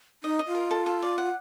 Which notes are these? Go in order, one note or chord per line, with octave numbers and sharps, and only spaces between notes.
D#4 D#5
D#5
F4
A#4
A4
A4
D5
F#5